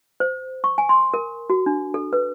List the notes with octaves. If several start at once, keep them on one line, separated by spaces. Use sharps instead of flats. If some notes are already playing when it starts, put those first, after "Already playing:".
C5
C#6
G#5
C6
A#4
F#4
D4
A4
B4